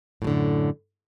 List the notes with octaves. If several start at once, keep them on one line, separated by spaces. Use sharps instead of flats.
F#2 A2 D3 F#3